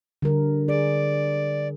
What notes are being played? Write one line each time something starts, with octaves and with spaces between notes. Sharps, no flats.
D3 G3 A#4
G#4 D5